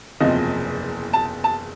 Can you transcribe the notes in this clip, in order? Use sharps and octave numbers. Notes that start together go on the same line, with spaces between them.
F#1 E2 C3 F3 D#5
A5
A5